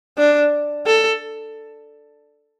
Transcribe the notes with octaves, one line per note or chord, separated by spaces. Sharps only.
D4
A4